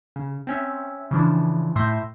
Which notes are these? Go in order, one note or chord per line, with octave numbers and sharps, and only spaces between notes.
C#3
C4 C#4 E5
C#3 E3 F3 D4
A2 E5 C6 G6 A#6